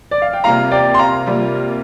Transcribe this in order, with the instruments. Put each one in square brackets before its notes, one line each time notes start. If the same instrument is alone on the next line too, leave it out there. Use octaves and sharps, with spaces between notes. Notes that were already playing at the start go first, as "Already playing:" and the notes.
[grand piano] D5
F5
G5
[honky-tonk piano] C3 G3 A#3 F4 [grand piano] F5 A#5
[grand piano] D5 G5
C6
F5 A#5
[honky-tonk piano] C3 G3 A#3 F4